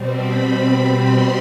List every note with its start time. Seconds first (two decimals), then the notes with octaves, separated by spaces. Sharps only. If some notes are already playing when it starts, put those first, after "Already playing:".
Already playing: B2 G3 C4
0.16 B5
1.01 C6